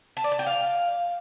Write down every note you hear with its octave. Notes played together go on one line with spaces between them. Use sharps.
A5
D5
A5
G5
F5